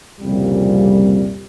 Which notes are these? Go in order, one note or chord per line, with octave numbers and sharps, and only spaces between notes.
C2 F2 A#2 C#3 G3